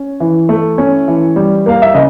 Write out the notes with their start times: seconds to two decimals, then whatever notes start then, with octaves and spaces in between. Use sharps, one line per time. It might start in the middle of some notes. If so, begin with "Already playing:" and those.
Already playing: C#4
0.20 E3
0.49 A3
0.78 C#4
1.08 E3
1.36 G3
1.66 A#3 F5
1.82 E5
1.94 C#3 D#5